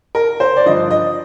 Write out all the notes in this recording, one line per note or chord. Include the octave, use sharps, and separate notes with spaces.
A#4
C5
D5
G2 D3 F3 D#5
D#5